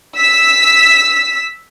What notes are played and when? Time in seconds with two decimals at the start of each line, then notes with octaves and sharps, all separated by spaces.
0.16 E6 B6